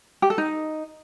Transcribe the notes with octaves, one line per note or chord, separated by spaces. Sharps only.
G4
A4
D#4